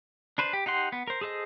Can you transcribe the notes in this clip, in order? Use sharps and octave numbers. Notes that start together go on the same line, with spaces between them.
D4 B4 C5
G4
D#4 G4 F#5 C6
B3
A#4 C5
G#4 A4 C5 D#5